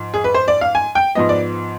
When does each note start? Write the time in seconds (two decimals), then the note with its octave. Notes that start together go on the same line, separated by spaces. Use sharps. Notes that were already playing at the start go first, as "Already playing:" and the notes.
Already playing: G#2 F3
0.14 G#4
0.24 B4
0.34 C5
0.48 D5
0.61 F5
0.75 G#5
0.95 G5
1.15 G#2 F3 B3 D#5
1.29 D5